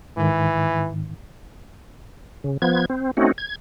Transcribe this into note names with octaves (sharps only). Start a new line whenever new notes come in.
G#2 D#3 E3
C#3
F3 B3 G#6
C4
A3 C4 C#4 D#4 F#4
G#6